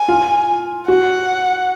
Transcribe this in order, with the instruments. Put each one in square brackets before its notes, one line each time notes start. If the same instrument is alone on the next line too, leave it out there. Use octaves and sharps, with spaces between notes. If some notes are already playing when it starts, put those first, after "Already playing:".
Already playing: [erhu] G#5
[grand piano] F4
[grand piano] F#4 [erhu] F#5